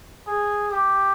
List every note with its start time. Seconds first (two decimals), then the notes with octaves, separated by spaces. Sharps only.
0.27 G#4
0.71 G4